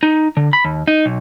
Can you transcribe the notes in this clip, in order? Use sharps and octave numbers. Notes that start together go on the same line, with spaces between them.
D#4
D3
B5
D#2
D#4
B1